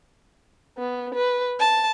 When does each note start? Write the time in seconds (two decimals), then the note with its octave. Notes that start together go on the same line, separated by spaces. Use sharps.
0.78 B3
1.14 B4
1.59 A5